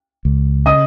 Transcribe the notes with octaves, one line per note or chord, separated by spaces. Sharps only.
C#2
C#3 D#5 D#6